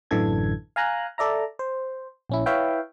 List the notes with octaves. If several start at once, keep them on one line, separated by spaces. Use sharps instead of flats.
A1 F#2 D3 E3 A4 G#6
F5 G#5 A#5 F#6
A4 D5 E5 A#5
C5
A#1 C#4 E4
E4 B4 C#5 E5 F5 G5